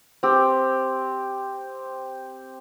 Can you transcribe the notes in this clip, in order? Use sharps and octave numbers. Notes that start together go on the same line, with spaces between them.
C4 G4